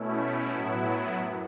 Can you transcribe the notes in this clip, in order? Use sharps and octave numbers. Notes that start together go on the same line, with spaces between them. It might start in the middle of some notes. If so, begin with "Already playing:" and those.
Already playing: B2 A3 C#4 E4
A2 F#3 B3 E4
F#2